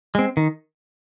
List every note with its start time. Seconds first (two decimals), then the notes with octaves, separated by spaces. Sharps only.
0.15 G#3 C4
0.37 D#3